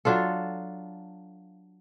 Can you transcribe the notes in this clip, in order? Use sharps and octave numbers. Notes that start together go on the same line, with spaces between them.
F#3 D4 F4 A4